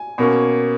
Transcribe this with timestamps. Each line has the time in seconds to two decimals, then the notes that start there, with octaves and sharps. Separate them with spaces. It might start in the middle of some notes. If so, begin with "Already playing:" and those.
Already playing: G#5
0.18 B2 A#3 C#4